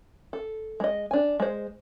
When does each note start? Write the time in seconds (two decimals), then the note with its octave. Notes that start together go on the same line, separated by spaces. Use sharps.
0.33 A4
0.80 G#3 D#5
1.11 D4 G#5
1.40 G#3 C5